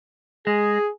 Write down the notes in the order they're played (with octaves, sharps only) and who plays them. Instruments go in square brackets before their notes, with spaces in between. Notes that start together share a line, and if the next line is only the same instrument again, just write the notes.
[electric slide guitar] G#3 [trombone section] G#4